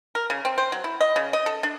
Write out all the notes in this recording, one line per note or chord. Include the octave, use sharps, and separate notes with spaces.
A#4
C#3
C4
C5
F#3
E4
D#5
C#3
D#5
A4
D4